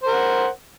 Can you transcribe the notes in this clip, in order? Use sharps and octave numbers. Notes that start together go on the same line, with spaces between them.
A#4 C5 F#5